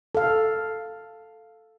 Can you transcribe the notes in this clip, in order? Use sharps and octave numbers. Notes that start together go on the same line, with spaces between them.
A4 F5